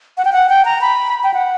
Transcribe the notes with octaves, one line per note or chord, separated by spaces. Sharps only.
F#5
G5
F#5
G5
A#5
B5
G5
F#5